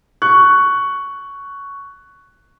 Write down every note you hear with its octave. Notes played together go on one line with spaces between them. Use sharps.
C#6 F#6